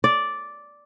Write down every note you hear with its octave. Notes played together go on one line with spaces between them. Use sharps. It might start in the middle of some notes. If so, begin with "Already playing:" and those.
D5